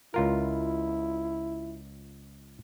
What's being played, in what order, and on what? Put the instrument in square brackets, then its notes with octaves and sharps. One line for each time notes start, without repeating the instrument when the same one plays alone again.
[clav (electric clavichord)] C#2 F4 A#4 [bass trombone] E4